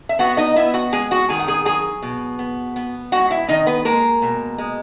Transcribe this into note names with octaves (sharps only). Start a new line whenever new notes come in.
E5
B3 F#4 F#5
D#4 D#5
B3 E4 E5
F#4 F#5
G#3 G#4 G#5
F#4 F#5
D#3 G#4 G#5
F#5
G#4 G#5
F#3 G#4 G#5
B2
B3
B3
G#3 F#4 F#5
E4 E5
D#3 D#4 D#5
B3 B4
G#3 A#3 A#4
B2
G#3